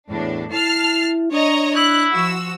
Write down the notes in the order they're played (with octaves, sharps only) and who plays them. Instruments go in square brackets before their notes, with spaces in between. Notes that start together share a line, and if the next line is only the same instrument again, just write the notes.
[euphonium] E2 [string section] A2 D4
[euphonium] E4 [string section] A5 F6 C7
[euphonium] D4 [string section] C#5 D#5 A#5
[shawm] E4 [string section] F#6
[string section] F3 F#4 E6